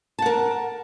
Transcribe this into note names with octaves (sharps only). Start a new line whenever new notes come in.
A#4 F#5 A5